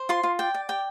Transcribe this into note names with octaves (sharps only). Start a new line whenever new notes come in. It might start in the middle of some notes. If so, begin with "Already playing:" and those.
Already playing: C5
F4 C6
F4
D5 G5
D5
G4 G5